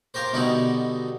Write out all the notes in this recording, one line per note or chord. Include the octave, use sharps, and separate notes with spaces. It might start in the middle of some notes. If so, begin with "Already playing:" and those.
F4 G4 A#4 C5
B2 D3 G3 D#4 E4